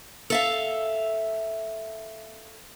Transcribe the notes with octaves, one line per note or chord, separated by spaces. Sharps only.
A4 E5 F5